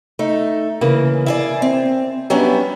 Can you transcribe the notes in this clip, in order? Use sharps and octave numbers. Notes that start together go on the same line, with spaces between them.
A3 D#4
C#3 E3 A#3
E4 G#4 D5
C4
F#3 G3 B3 C#4 D4 E4